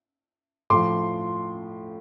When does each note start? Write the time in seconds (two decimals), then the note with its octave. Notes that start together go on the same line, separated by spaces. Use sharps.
0.70 A2 F3 C6 D6